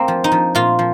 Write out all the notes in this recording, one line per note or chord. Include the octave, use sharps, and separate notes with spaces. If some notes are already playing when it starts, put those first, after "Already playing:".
Already playing: A#3 C4
F3
D#4
F3
A#2 F4
F3